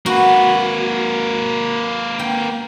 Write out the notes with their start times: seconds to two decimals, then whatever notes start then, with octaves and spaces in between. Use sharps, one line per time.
0.06 A#3 F#4 B4
2.19 G5